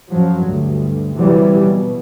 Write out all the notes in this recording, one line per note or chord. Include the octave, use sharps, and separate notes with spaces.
F#2 F3 F#3
D2 G2
C3 E3 F#3 G3
B2